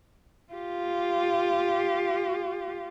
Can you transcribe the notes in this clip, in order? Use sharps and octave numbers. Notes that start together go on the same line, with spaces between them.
F4 G4